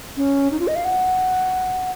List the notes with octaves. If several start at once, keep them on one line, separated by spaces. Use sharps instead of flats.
C#4
D#4
F4
D#5
F5
F#5